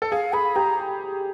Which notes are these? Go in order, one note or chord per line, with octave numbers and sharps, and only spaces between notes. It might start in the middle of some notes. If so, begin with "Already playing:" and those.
A4
G#4 F5
G#4 B5
G4 A#5